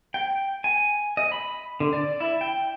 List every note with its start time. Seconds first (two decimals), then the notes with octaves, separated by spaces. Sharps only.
0.14 G5
0.64 G#5
1.17 D#5
1.32 B5
1.80 D3
1.93 D5
2.20 E4
2.41 G5